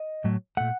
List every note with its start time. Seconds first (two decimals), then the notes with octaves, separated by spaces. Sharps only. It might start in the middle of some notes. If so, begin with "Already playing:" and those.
Already playing: D#5
0.24 A2 F#3 A3
0.57 A#2 A3 F#5